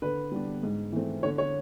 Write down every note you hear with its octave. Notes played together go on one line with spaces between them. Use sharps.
D3 B4
G3 B3 D4
G#2
E3 A3 C4
D3 C#5
C#5